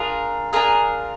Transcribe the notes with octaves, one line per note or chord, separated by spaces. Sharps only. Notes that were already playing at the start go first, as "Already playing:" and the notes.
Already playing: D4 F4 G#4 A#4
D4 F4 G#4 A#4